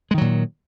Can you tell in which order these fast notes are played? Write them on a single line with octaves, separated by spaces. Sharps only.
G#3 D#3 F#3 A#2